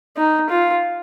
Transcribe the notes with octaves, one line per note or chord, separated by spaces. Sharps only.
D#4
F4